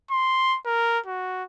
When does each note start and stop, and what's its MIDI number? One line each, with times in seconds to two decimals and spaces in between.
0.11 0.57 84
0.66 0.99 70
1.06 1.44 66